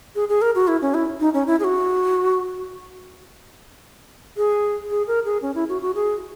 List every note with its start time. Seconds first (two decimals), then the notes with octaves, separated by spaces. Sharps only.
0.15 G#4
0.29 G#4
0.42 A#4
0.55 F#4
0.68 E4
0.82 C#4
0.94 E4
1.20 D#4
1.34 C#4
1.47 E4
1.60 G#4
1.64 F#4
4.37 G#4
4.90 G#4
5.07 A#4
5.25 G#4
5.42 C#4
5.55 E4
5.69 F#4
5.82 F#4
5.95 G#4